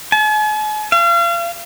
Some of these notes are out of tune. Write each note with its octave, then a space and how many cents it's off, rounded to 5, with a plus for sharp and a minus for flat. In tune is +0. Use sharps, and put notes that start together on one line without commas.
G#5 +45
F5 -35